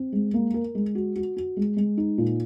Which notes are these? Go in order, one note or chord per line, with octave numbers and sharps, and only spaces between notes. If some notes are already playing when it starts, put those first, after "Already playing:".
Already playing: C4
G#3
A#3
A#4
G#3
F#4
F#4
F#4
G#3
G#3
D#4
A#2